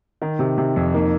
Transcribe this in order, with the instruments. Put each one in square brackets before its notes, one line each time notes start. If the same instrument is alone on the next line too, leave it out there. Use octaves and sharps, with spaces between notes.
[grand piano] D#3 [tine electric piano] D#4
[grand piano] C3
C3
F2
[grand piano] A#3 [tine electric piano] D#4